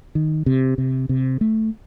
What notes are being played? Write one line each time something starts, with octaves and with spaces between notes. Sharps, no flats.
D#3
C3
C3
C3
A3